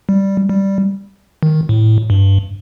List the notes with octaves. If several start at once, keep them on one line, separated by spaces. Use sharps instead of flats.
G3
G3
D#3
A2
G2